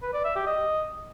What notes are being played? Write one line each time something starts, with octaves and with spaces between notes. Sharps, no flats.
B4
D5
E5
G4
D#5